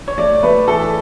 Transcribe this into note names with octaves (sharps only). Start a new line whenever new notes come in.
C#5
A3 D5
A3 B4
E3 A4